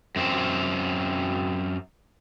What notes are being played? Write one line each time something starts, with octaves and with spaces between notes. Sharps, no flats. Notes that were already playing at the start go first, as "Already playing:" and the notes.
F#2 C4